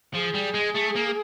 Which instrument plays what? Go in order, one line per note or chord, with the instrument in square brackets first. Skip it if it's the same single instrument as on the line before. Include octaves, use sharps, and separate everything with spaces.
[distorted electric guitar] F3 [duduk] G#4
[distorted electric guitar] G3
G#3
A3
A#3